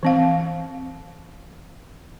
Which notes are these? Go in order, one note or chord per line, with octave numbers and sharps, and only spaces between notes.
E3 C4 F5